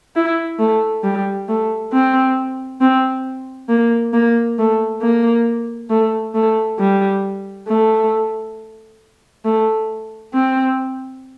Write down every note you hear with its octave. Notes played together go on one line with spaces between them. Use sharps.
E4
A3
G3
A3
C4
C4
A#3
A#3
A3
A#3
A3
A3
G3
A3
A3
C4